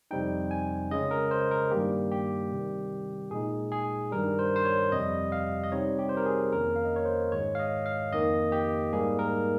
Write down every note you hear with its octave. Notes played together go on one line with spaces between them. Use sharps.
F2 C3 G3 C4 D#4 G5
G#5
C#3 G#3 C#4 D#5
A#4
C5
A#4
G2 D#3 G3 A#3 G4
G4
C3 D#3 G3
A#2 G#3 D#4 G#4
G#4
G2 D#3 G3 A#4
C5
C5
C#5
F2 C3 G3 D#5
F5
D#5
C3 G3 C4 D#4 C#5
G4
C5
A#4
G#4
F2 D#3 A#3 C#4 A#4
F5
D#5
C#5
C5
G#2 D#3 G#3 C#5
F5
D#5
F5
F2 D#3 A#3 D#5
G4
G#2 G3 A#3 D#4 G#4
A#4